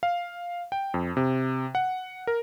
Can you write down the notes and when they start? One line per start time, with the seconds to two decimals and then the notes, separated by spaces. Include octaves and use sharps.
0.03 F5
0.72 G5
0.94 F2
1.17 C3
1.75 F#5
2.27 A#4